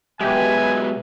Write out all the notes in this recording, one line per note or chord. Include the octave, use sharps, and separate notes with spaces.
B2 F#3 G#3 G4 B4 E5 G#5